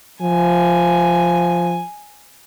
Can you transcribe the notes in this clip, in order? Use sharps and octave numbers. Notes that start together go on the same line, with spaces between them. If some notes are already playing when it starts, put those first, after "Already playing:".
F3 G#5